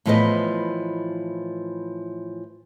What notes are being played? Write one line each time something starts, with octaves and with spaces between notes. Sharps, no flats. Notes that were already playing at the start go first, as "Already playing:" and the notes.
A2 E3 F3 B3 B4 D#5